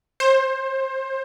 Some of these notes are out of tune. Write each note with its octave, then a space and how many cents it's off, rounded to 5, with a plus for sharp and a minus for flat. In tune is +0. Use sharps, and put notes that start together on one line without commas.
C5 +25